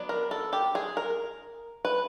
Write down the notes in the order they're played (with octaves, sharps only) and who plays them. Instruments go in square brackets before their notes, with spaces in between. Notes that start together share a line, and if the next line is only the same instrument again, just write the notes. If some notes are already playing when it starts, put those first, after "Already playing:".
Already playing: [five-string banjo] F#3 B3 D4
A#4
A4
G4
G#4
A#4
B4